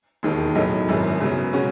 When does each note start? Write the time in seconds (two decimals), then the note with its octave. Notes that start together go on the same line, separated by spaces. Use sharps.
0.23 E1 D#2 D#3
0.55 B1 A2 F#3 A3 D#4
0.88 G#1 F#2 E3 G#3
1.20 F#2 C#3 F#3 B3
1.53 C#3 G#3 C#4 F#4